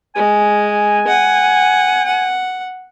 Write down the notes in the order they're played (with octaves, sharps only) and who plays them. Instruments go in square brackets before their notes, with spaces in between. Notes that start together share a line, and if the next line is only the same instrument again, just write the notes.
[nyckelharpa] G#3 [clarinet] G#5
[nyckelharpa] F#5
F#5